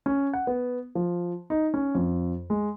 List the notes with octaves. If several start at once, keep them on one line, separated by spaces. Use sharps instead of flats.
C#4
F#5
B3
F3
D#4
C#4
F2
G#3